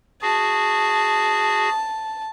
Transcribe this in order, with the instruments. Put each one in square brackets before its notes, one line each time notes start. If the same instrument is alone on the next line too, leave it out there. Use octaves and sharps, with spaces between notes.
[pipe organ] F#4 G#4 [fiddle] A5